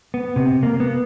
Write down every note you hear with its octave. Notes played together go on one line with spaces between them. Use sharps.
B3
C3
A#3
B3